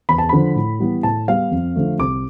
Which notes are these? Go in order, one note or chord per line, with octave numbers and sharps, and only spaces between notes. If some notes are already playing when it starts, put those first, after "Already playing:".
E2 B5
A5
D3 F3 B5
A2
E3 G3 B3
A2 A5
G3 B3 F5
F2
D3 F3 A3
C2 D6